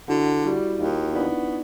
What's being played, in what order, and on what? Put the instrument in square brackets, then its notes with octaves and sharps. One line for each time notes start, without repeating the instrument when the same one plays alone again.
[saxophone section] D3 [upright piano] E4 F#4
[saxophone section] G3 [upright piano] E4 F#4
[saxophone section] D#2 [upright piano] D#4 F4
[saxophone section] B3 [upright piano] D4 E4